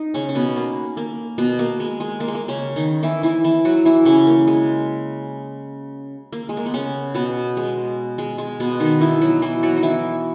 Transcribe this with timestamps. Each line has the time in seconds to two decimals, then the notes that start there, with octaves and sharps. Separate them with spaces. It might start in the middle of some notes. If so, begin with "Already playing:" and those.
Already playing: D#4
0.14 C#3 C#4
0.29 C#4
0.35 B2 B3
0.56 A#3
0.97 A#3
1.38 B2 B3
1.59 A#3
1.80 G#3
2.00 G#3
2.20 A#3
2.28 G#3
2.35 A#3
2.48 C#3 C#4
2.76 D#3 D#4
3.03 E3 E4
3.23 E3 E4
3.44 E3 E4
3.65 F#3 F#4
3.85 E3 E4
4.06 C#3 C#4
4.27 A#3
4.47 G#3
6.33 A#3
6.49 G#3
6.57 A#3
6.66 B3
6.74 C#3 C#4
7.15 B2 B3
7.57 G#3
8.18 G#3
8.38 G#3
8.60 B2 B3
8.80 D#3 D#4
9.01 E3 E4
9.21 F#3 F#4
9.42 E3 E4
9.63 F#3 F#4
9.77 D#4
9.83 E3 E4